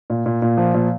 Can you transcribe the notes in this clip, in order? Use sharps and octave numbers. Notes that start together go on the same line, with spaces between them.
A#2
A#2
A#2
F3
A#2